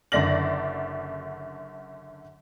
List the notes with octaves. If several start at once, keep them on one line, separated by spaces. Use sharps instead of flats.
F#1 F#2 D3 D5 A#6 F#7